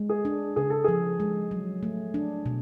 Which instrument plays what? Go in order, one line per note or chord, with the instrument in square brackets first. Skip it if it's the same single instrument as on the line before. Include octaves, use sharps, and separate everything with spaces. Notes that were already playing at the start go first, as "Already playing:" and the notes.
Already playing: [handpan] G#3
[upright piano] G#4
[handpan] D4
[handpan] C#3 [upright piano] G#4
[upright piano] A4
[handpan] F3 [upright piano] G#4
[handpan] G#3
F#3
A3
D4
B2